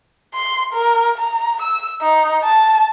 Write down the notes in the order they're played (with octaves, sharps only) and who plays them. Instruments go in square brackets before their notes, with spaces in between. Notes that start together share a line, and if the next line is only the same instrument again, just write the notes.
[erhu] C6
A#4
A#5
E6
D#4
A5